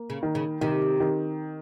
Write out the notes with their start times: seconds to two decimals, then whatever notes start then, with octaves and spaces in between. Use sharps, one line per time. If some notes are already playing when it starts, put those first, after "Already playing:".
Already playing: A#3
0.10 C#3
0.23 D#3
0.35 C#3
0.61 C3 D#3
1.00 D#3